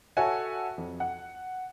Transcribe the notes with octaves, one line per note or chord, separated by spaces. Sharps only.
F#4 A4 C#5 E5 F#5 G#5
F2
F#5